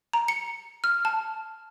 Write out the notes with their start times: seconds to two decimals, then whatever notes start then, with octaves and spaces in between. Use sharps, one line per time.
0.13 A#5
0.28 C#7
0.84 F6
1.05 A5